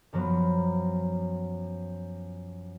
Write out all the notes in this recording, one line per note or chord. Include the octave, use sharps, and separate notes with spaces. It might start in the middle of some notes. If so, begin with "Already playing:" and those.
F#2 F3 F#3 B3